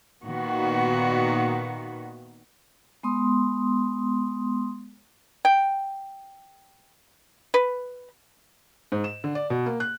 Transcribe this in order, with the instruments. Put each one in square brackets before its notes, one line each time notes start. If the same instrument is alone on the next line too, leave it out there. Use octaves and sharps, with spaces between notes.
[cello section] A#2 D#3 B3 F#4
[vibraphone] G#3 B3 C6 D#6
[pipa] G5
B4
[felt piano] G#2
E7
D3
D5
B2
A#3
F#6